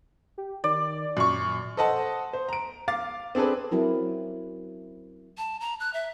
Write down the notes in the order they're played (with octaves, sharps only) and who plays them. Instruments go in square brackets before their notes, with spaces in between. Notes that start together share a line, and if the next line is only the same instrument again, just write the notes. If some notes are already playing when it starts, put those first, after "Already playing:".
[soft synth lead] G4
[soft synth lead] D#3 [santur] D5
[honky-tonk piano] F#2 C#6 [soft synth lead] A#2
[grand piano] A4 C5 D#5 F#5 A5
C5
A#5 D7
F5 D6 A6
C4 D4 G#4 A4 B4
[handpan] F#3 C4 E4 A#4
[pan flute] A5
A#5
F#6
E5